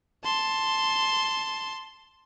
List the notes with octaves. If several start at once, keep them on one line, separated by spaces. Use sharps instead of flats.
A5 C6